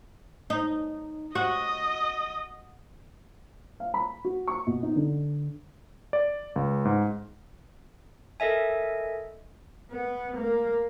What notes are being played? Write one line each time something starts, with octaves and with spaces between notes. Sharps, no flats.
D#4
F#4 D#5
F5
B5
F#4
C#6
B2
D#4
D3
D5
C#2
G#2
A4 A#4 D#5 E5 G#5
B3
A#3